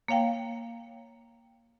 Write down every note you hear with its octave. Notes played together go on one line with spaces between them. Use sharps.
A#3 C#5 F5 G5